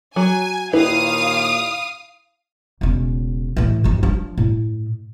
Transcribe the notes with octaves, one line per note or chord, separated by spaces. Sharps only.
F#3 G#5
D#2 A#2 D#3 E4 B4 F5 D#6
E1 C#3
A2 E3
G#1 F2
F3 D4
A2